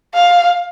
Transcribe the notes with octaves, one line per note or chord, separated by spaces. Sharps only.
F5